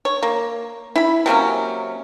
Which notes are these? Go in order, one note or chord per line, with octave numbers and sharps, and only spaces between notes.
C#5
A#3
E4 B5
C3 F#3 A#3 C#4